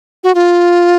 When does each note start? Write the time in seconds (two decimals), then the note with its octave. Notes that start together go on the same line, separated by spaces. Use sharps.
0.24 F#4
0.35 F4